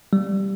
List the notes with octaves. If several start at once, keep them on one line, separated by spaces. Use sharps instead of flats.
G3